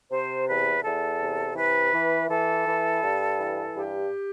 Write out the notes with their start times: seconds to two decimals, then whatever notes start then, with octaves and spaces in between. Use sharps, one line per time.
0.11 C3 C5
0.47 E2 B4
0.83 E2 A4
1.20 C3
1.56 E3 B4
1.92 E3
2.28 E3 A4
2.65 E3
3.01 G2
3.38 E3
3.73 G2 G4